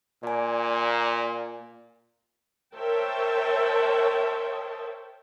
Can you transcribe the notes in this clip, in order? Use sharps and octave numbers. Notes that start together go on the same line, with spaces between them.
A#2 D5 G#5
A#4 C5 C#5 E5 G5 A5